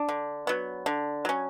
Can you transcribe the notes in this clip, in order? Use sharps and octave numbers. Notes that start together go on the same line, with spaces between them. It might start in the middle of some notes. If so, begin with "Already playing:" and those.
Already playing: D4
D3
F#3 B3
D3
F#3 C#4